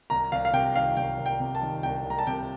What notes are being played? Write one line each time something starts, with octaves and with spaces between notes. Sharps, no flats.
C2 A#5
C2 F5
F5
C3 G5
D#3 F5
C2 G5
C2
G5
C3
A5
D#3
C2 G5
C2
A#5
A5
C3 G5